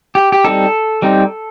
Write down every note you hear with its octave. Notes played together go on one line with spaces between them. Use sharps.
G4
G4
G3 C4 D#4 A4
G3 C4 D#4